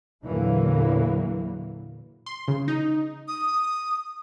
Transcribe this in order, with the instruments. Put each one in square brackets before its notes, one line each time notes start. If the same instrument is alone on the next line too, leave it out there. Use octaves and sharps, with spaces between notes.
[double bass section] E2 A#2 D3 E3 F#3 A#3
[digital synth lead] C6
C#3
D#4
[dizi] D#6